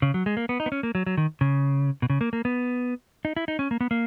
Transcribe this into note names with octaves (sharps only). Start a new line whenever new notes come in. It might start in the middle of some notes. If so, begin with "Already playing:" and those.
C#3
F#3
G#3
A#3
B3
D#4
B3
C#4
A#3
F#3
F#3
D#3
C#3
B2
C#3
A#3
A#3
B3
D#4
E4
D#4
C#4
A#3
B3
A#3